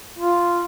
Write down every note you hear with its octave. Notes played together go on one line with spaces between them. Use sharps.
F4